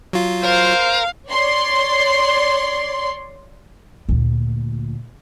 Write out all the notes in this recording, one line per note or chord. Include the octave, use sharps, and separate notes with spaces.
F#3 F4
A#4 C5 F5
C#5 D5 C6
D2 A#2